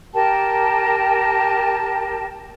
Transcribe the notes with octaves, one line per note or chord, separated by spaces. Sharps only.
G4 A#4 G5 A5